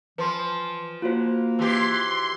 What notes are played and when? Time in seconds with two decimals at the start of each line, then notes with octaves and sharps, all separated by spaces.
0.18 E3 F3 B4 C6
1.02 A#3 F4 F#4 C5
1.59 E3 G4 C6